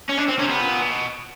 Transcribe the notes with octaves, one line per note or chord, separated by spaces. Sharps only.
C#4
D4
C4
C3 C#4
B3
A#2
B2